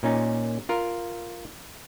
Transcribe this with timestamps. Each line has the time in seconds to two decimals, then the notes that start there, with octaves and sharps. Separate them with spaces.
0.03 A#2 C#4 D#4
0.69 F4 A#4